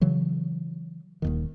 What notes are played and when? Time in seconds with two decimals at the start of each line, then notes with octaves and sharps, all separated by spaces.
0.01 C#3 E3 F#3
1.22 D#1 D#2 D#3